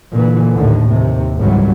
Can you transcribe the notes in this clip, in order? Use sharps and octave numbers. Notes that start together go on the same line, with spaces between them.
A#2 D3 E3
D#2 A2 D3
D#2 C3
G#1 C#2 E3 F#3 G3